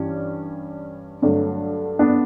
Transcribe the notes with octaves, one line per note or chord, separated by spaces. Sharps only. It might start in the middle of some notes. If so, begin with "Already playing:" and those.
Already playing: G2 E3 G3 C#4
G2 D3 F#3 A3
B3 D4